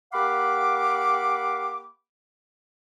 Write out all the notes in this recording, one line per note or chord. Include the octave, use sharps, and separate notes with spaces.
A#3 G4 F5 F#5 B5 D6